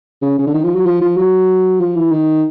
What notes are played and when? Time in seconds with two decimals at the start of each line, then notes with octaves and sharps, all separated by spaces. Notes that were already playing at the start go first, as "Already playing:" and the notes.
0.22 C#3
0.38 C#3
0.47 D3
0.54 D#3
0.64 F3
0.75 F#3
0.85 F3
1.01 F3
1.17 F#3
1.80 F3
1.95 E3
2.11 D#3